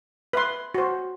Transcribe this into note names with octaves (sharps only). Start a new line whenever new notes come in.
B4 E5 C6
F#4 C5